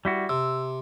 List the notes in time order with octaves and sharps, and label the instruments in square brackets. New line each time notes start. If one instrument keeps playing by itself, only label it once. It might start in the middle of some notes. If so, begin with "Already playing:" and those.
[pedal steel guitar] G3 E4 F#4
[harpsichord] C3 [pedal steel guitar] E6